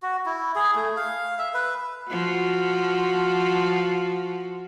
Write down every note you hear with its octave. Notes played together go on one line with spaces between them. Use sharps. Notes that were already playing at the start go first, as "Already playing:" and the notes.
F#4
E4
G#4
A3
F5
E5
B4
F3 F#4